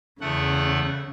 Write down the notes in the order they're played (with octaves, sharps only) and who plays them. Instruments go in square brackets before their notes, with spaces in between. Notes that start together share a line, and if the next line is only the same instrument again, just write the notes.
[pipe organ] E2 A3 F#5 [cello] C#3